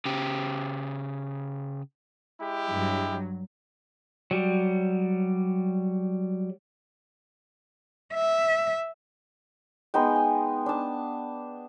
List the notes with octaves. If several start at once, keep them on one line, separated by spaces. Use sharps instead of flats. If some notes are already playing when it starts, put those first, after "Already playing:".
C#3 G4
G#3 E4 G4
G2 F#3
F#3 G3
E5
G#3 B3 D#4 G5
G#5
D4 A5